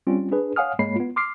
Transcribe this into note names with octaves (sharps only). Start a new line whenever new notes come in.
G3 C4 C#4 F4
D4 G#4 B4
C#5 F5 F#5 G#5 D#6 F6
G#2 G#3 A#3 C#5 B5 C7
B3 F4
C6 D6 F6 C7